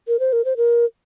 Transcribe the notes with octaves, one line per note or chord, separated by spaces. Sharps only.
A#4
C5
A#4
C5
A#4